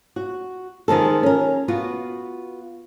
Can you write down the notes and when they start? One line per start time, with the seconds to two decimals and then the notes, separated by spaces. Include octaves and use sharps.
0.16 F#4
0.88 D#3 F3 G#3 A4
1.23 C#4 A#4
1.68 B3 F4 F#4